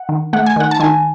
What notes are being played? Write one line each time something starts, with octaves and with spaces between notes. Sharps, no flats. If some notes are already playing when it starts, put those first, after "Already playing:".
Already playing: F#5
D#3
A3 F#5
G#5
D#3 F#5
A5
D#3 G#5